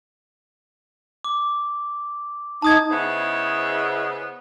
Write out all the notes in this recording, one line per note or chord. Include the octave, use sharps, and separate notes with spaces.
D6
D#4 A5 D#6 G#6
C#3 B3 E4 G#4 C5 D#5